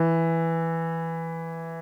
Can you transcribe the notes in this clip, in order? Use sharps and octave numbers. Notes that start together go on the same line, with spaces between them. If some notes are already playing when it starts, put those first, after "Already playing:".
Already playing: E3